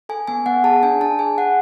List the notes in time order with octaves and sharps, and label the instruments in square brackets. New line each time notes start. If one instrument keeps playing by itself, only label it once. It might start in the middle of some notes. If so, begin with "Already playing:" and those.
[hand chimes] A4 G#5
B3 G#5
B3 F#5
G#4 A5
D4 G#5
D4 A5
G#4 G#5
G#4 F#5